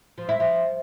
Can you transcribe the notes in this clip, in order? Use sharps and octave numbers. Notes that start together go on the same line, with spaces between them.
F3
E4
F3